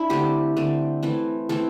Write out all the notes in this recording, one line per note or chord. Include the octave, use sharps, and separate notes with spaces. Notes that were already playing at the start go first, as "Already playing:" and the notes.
Already playing: D4 E4
D3 A3 C4 G4
D3 A3 C4
E3 A3 C4
E3 A3 C4 A4